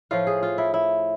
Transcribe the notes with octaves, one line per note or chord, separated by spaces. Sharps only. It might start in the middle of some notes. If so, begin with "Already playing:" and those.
A2 F3 F4
G#4
F4
E4
E4